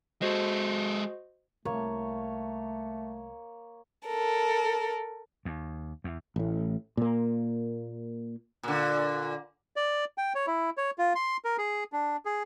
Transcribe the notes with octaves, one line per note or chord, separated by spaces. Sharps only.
G#3 F#4 A4 C5 D#5
C2 A3 A#3 C#5
A4 A#4
D#2
E2
A1 A2
A#2 A#3
A#2 D3
D5
G5
C#5
E4
C#5
F4
C6
A#4
G#4
D4
G#4